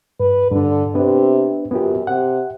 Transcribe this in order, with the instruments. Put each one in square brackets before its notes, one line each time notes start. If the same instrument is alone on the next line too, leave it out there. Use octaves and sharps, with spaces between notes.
[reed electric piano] G2 [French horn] B4
[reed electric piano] G2 D4 [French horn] D3
[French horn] C3 [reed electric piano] B3 D4 B4
[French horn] F#2 [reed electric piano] B3 F4 G4
[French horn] C3 [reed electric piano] F#5